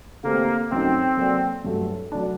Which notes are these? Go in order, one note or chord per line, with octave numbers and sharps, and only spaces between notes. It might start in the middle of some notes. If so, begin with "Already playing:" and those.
D3 A3 A#3 C4 G4 C5
F#2 F#3 A3 C4 D#4
F#3 A#3 F#4 A4 D5
G2 F#3 A3
F#3 A3 D4